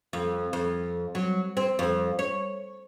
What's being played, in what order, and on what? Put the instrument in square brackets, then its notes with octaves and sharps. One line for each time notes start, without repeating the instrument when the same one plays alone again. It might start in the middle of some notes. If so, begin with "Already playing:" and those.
[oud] F2
F2
F#3
C4
F2
C#5